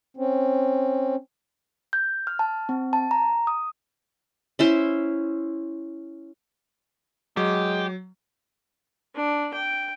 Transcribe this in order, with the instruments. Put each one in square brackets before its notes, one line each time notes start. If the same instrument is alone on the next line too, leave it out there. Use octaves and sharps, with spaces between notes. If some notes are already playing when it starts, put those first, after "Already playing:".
[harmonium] C4 C#4
[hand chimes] G6
F6
A5
C4
A5
A#5
D#6
[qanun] C#4 E4 C5
[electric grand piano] F#3 [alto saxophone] G#3 [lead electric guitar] G4
[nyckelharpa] D4
G5